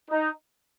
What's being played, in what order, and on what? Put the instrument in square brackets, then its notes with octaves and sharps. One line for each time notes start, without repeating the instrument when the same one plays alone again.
[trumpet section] D#4